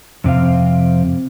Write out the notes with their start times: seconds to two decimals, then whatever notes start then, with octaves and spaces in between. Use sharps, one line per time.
0.24 F2 C3 C4 F5